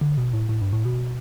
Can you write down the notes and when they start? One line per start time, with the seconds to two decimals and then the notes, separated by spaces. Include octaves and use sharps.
0.01 D3
0.17 B2
0.33 A2
0.49 A2
0.61 G2
0.73 A2
0.85 B2